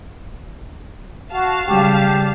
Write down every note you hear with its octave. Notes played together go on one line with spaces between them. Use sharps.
F#4 F5 A5
C#3 G3 G4